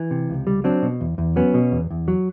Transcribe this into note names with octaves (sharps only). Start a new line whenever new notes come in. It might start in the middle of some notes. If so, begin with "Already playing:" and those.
Already playing: E3
C3
C#2
G3
F#3 C4 D4
B2
E2
E2
F#3 B3 C#4
B2
E2
E2
F#3